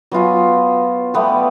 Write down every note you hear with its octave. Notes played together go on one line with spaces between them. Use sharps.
F#3 B3 F4 G#5
G3 A3 B3 G4